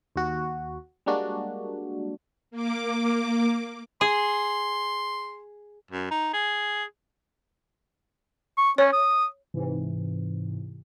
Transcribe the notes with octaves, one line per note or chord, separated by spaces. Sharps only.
D#2 F#4
G3 G#3 A#3 D4 F#4
A#3 D6
G#4 C6
F#2
D#4
G#4
C#6
C#4 C#5
D#6
G#2 C3 E3